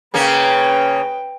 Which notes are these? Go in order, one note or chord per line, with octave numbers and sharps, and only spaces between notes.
C#3 A#3 C#4 B4 G5